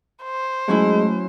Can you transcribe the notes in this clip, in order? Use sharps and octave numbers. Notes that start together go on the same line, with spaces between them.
C5
F#3 G#3 A3 C#4 E4